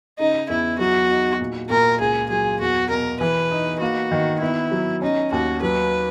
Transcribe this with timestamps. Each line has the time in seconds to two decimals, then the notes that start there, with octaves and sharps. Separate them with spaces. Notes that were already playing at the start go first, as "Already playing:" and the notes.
0.19 C#3 D#4
0.49 E2 E4
0.79 F#3 F#4
1.10 D#4
1.40 A#2
1.70 A#2 A#4
2.01 C#2 G#4
2.30 F#3 G#4
2.61 E2 F#4
2.90 B2 A#4
3.21 E3 B4
3.51 D#4
3.81 A#3 F#4
4.11 D#3
4.41 B3 E4
4.72 F#3
5.02 C#4 D#4
5.32 D#2 F#4
5.62 F#3 B4